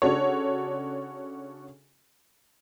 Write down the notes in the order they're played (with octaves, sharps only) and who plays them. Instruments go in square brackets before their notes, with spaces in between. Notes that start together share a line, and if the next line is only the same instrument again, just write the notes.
[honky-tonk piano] C#3 D4 F#4 A4 C#5